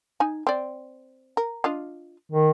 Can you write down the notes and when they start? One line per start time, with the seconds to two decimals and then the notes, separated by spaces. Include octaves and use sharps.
0.20 D#4 G#5
0.47 C4 D5
1.37 A#4
1.64 D4 F4 D#5
2.32 D#3